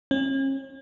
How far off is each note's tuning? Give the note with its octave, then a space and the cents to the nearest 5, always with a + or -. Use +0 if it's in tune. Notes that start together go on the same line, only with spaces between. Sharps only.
C#4 -40